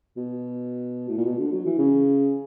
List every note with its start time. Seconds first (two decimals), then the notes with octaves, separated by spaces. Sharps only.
0.17 B2
1.09 A2
1.18 A#2
1.25 B2
1.39 D3
1.52 F#3
1.66 E3
1.78 C#3